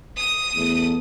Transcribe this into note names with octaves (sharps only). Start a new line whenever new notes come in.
D#6 D#7
E2 A3